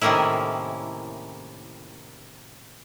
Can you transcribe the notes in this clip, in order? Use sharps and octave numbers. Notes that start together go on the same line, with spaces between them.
A2 C3 D#3 A#3 C#4 E4